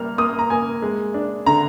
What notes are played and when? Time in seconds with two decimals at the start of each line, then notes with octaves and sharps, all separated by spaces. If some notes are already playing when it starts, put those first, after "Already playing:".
Already playing: G3 A#3 F6
0.18 A#3 D#6
0.39 A#5
0.50 A#3 G#5
0.82 G#3
1.14 D4
1.46 D3 A#5